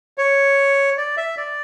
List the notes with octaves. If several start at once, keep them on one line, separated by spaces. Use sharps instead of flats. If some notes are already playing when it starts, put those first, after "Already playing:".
C#5
D5
E5
D5